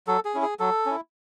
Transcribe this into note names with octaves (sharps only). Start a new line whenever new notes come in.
F#3 A4
G#4
C#4 E4
G#4
F#3 A4
C#4 E4